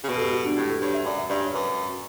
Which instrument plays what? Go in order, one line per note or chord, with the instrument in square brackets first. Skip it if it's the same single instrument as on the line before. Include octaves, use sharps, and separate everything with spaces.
[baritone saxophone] C#3
[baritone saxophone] B2 [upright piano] B4
[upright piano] A4
G4
F#4
D4
[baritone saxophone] A2 [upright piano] G4
[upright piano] A4
[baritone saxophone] G2 [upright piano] C#5
[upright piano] E5
[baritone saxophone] F#2 [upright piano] D5
[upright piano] E5
[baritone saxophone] G2 [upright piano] D5
[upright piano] C#5
[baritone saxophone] F#2 [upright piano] B4